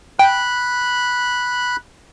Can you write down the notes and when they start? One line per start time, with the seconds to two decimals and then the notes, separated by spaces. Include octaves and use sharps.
0.19 G5 B5 F#6